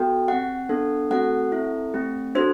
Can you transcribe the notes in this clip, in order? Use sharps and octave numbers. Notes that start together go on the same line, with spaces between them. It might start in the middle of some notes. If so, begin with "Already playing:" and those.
Already playing: B3 F#4 A4 G5
C4 G4 F#5
B3 D4 A4
A3 C4 F#4 A4 F#5
C4 E4 A4
A3 C4 G4
D4 F#4 A4 C5